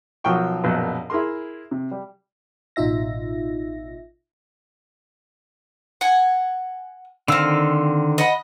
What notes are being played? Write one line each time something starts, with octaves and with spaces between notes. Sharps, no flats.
B1 F3 F#3 A#4 G5 C#6
A#1 F#2 B2 B4
E4 G#4 A#4 C6
C3
G3
A1 B2 D#4 F4 E5 A#6
F#5 G#5
D3 D#3 C4 F5 E6
D#5 F#5 B5